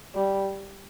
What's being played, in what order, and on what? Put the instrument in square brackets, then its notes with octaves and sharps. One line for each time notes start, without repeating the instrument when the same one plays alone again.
[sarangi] G3